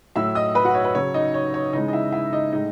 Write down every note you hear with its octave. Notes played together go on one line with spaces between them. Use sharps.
A2 F#3 E5 E6
D#5 D#6
B4 B5
F#4 F#5
C#5
B4
C#3 F#3 C#5
D#4 D#5
C#5
C#5
C#3 E3 G#3 D#4 D#5
D#5
E4 E5
E4 E5
D#4 D#5
A2 G#3 D#4 D#5